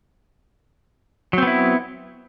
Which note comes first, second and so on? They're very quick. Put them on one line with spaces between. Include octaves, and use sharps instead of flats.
F#3 C4 B3 E4